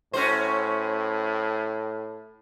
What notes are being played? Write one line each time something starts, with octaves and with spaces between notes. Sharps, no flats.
A2 C#4 F#4 C5